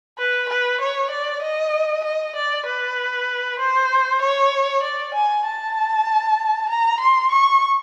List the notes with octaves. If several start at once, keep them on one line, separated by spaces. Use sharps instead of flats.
B4
B4
C#5
D5
D#5
D#5
D5
B4
C5
C#5
D5
G#5
A5
A#5
C6
C#6